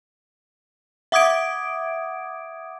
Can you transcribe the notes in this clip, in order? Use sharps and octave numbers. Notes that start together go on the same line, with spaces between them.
E5 F#5 D6 D#6 G#6 D7